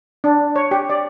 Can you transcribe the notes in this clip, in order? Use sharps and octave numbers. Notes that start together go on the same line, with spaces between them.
D4
C#5
G4
D5